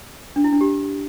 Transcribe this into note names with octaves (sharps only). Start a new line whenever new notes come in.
D4
E4
D4
G4